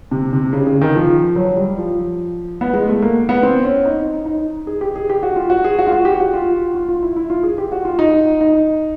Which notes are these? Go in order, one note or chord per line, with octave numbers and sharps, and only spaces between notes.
C3
C3
C#3
C#3
D#3
F3
F#3
G3
F3
B3
G#3
A3
A#3
B3
C4
C#4
D#4
D#4
G#4
G4
G#4
G4
F#4
F4
F#4
G#4
F#4
F4
F#4
G4
F#4
F4
F4
F4
E4
E4
F4
G#4
G4
F#4
F4
D#4
D#4